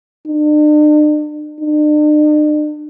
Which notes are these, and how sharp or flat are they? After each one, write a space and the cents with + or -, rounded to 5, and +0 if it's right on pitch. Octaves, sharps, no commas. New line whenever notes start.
D4 +45
D4 +45